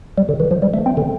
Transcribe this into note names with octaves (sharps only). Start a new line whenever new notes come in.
G3
D3
E3
F3
G3
A3
C4
D3